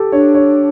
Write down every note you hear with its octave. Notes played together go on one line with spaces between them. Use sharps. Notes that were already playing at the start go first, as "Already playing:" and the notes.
Already playing: G4 A4
D4 C#5
C#5